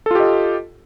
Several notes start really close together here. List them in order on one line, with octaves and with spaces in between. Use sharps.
A4 F4 G4 D#5